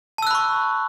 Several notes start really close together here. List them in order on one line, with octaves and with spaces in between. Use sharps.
A5 E6 F#6 B5 C#6